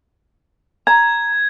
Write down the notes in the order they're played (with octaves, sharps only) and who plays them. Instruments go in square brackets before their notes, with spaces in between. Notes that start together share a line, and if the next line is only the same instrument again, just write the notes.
[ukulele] A#5 [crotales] G#6